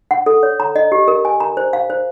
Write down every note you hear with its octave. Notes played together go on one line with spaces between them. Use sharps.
F#5
A4
C#5
A#5
D#5
G4
A#4
G#5
A#5
C5
F5
C5